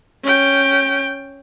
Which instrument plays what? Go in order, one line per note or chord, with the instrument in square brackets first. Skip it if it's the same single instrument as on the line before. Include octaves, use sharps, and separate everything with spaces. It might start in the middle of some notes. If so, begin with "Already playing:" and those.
[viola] C#4 G5